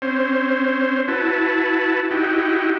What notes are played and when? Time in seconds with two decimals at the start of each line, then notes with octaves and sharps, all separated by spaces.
0.02 C4 C#4 C5
1.08 E4 F#4 B4 A5
2.11 D#4 E4 F#4 G4